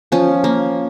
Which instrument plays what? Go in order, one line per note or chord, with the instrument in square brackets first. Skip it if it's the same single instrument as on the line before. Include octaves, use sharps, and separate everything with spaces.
[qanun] F3 C#4
A#3